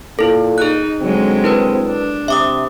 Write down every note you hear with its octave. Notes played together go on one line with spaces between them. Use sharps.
A#2 E4 A4
D#4 G#4 F#6
D3 F#3 G#3 C4
E4 A#4 B4
D4
C3 E5 D6 D#6